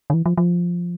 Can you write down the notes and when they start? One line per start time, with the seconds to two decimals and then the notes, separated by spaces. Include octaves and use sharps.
0.10 D3
0.14 E3
0.26 F3
0.37 F3